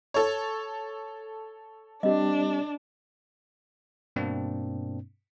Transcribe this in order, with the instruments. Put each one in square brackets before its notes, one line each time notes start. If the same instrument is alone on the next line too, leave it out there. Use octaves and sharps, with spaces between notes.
[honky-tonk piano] A4 C#5
[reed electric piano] G3 C4 G4 [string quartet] D4 [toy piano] D#5
[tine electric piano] G2 B2 A#3 C4 D4